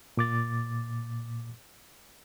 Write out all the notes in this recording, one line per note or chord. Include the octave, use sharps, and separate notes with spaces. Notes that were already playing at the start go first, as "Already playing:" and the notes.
A#2 D6 A6